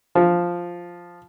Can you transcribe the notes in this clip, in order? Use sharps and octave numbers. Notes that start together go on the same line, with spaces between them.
F3